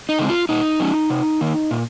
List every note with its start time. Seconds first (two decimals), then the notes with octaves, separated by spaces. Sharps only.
0.09 D#4
0.19 C#3 G#3 C4
0.30 F4
0.49 A#2 D#4
0.80 F#3 C#4
1.10 C3
1.41 D#3 A#3
1.71 A#2